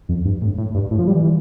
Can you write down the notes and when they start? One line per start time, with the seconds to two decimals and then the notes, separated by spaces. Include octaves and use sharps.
0.09 F2
0.25 G2
0.41 A2
0.58 A2
0.75 G2
0.91 A2
0.99 F3
1.07 G3
1.16 E3